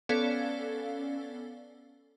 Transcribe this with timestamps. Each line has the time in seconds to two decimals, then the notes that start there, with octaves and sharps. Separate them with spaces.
0.09 B3 C#4 A4 D5 F5